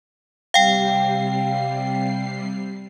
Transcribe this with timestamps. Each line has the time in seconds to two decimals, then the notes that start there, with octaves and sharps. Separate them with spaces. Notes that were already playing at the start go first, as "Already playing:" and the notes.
0.54 C3 G3 F5 G5 C7